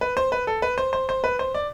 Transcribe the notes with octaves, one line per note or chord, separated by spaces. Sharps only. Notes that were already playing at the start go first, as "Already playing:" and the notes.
B4
C5
B4
A4
B4
C5
C5
C5
B4
C5
D5